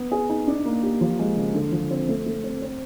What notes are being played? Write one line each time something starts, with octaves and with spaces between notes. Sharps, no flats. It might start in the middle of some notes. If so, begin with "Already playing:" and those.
Already playing: B3
G#4
D#4
D4
A#3
G4
F3
G#3
C#3
D3
F3
C4
A3
A3
C4
C4